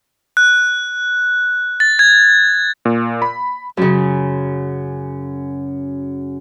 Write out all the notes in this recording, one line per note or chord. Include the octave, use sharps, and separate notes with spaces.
F#6
A6
G#6
A#2
B5
F#2 C#3